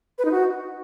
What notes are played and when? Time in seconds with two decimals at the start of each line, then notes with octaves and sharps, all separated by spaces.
0.18 B4
0.25 D#4
0.32 F#4